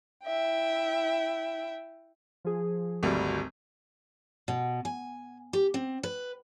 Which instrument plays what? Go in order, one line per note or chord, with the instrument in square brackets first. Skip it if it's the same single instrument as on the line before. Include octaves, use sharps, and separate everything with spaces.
[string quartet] E4 E5 G5
[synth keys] F3 G#4
[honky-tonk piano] G#1 D2 G3
[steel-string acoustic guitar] B2
G#5
G4
C4
B4